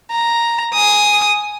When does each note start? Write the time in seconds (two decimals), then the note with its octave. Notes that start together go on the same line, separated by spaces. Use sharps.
0.11 A#5
0.74 G#5 D#6